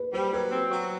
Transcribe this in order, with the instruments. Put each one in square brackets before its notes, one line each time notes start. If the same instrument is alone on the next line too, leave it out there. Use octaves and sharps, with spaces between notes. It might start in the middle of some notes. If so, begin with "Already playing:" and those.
Already playing: [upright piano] B4
[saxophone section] G3 [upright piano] C5
[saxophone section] F#3 [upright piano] B4
[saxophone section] C4
F#3